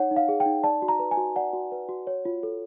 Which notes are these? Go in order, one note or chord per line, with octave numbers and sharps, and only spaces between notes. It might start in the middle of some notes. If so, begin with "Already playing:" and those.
Already playing: D#4 C#5 F#5
D#4
F5
G#4
G5
D#4
D5 A5
F#4
A#5
B4
G#5
F#4
D5 F#5
F#4
B4
F#4
C#5
F4
A4